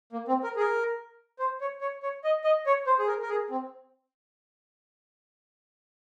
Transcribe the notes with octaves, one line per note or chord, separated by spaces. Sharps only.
A#3
C4
A#4
G#4
A#4
C5
C#5
C#5
C#5
D#5
D#5
C#5
C5
G#4
A#4
A#4
G#4
C4